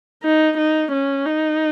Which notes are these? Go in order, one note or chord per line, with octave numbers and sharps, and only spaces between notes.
D#4
D#4
C#4
D#4